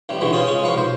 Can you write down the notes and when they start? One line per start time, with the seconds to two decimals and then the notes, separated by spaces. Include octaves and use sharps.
0.09 A1 A2 G3
0.21 C#2 G#2 B2 D3 E3 A3
0.33 C4 C#4 F4 D#6
0.47 G#3 C#4 D#6
0.63 C2 F3 F#3 B4 F5
0.76 B1 C5